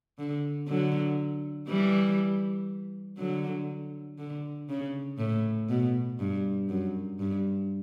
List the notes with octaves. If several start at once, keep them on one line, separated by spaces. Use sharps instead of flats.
D3
D3 F#3
E3 G3
D3 F#3
D3
C#3
A2
B2
G2
F#2
G2